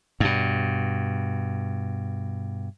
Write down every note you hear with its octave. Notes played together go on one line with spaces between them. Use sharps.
G2 B2